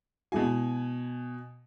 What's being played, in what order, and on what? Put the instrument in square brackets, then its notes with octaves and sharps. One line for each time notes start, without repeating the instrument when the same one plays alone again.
[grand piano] B2 G#5 [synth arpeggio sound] G#3 E4 F#4